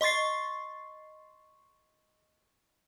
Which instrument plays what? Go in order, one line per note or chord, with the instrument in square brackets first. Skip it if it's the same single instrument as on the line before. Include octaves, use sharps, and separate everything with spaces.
[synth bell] D#5 C6 C#6 A6 C7